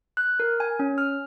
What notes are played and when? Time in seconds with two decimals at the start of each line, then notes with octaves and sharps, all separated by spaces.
0.17 F#6
0.40 A#4
0.60 G#5
0.79 C#4
0.98 F6